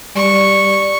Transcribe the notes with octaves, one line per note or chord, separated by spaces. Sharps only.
G3 D5 C#6